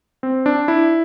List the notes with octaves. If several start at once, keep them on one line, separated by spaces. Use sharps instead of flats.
C4
D4
E4